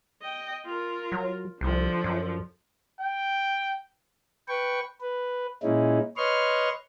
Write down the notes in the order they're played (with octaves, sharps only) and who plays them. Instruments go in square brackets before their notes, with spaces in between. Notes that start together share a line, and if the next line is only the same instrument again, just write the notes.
[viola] D#5 G5
F4 A#4
[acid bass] F#3
[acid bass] C2 [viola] D3 F3
[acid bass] F#2
[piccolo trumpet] G5
[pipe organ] B4 G5 C#6
B4
A#2 G#3 C#4 D#4 E4
B4 C#5 D#5 C6 C#6 F6